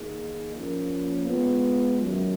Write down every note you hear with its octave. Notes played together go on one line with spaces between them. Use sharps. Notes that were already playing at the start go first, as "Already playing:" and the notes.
Already playing: D#3 A#3 D#4 G#4
F3 A#3 C#4
G#3 B3 F4
F#2 D#3 F#3